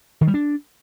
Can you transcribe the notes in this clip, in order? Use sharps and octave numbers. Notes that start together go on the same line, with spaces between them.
D#3
G3
D4